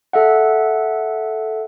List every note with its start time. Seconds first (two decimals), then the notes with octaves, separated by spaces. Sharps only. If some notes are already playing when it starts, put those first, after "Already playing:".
0.13 A4 E5 F#5